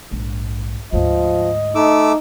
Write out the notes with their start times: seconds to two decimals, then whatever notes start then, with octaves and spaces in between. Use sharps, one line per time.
0.11 A#1 G#2
0.93 D2 G#2 F3 D#5
1.75 A3 D#4 D6 E6